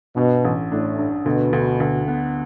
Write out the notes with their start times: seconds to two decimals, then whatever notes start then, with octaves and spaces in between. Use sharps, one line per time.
0.16 G2 B2
0.44 A1
0.71 A2 D4
0.98 G2
1.26 D2 B2
1.53 D2
1.80 D2
2.08 B3